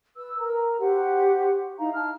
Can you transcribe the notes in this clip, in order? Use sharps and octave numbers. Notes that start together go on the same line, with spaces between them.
B4 E6
A#4 A#5
F#4 G4 C5 F#5
D#4 E4 F5 A#5
A5 F6